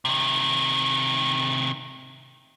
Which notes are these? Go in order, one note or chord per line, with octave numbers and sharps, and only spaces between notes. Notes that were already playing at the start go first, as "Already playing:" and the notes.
C3 D#3